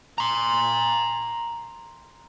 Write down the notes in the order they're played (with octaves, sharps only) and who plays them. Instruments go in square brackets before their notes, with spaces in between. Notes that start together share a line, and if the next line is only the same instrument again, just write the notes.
[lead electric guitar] A#5 C6